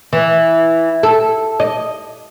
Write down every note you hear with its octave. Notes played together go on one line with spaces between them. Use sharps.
E3
A4
D#5